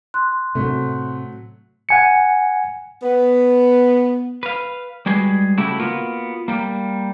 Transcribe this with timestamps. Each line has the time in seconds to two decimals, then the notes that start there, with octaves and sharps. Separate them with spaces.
0.14 C6 F#6
0.55 A2 C3 F#3 A3
1.89 F#5 G#5 C#7
3.03 B3
4.43 B4 F5
5.06 G3 G#3 F#4 G#4 B4
5.58 C#3 A3 E4 F#4 G4
5.79 A#3 B3 F4 F#4 A#4
6.48 G3 A#3